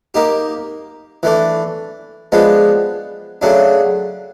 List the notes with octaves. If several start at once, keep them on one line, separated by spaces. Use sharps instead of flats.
A#3 D#4 G4
E3 A3 D4
F3 G#3 B3 D4
C#3 F#3 A3 D4